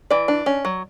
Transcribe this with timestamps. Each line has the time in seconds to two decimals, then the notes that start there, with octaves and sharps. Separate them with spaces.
0.11 E3 D5
0.28 D4
0.46 C#4
0.65 F#3